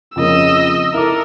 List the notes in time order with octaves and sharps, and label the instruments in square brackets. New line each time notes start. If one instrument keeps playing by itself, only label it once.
[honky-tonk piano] F2 C#3 A#3 [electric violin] D#5 E6
[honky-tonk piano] E4 D6 [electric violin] A4 A#4